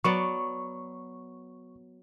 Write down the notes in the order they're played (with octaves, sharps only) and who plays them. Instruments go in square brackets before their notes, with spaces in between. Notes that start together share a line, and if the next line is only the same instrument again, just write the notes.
[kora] F#3 B3 D5 [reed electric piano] C#6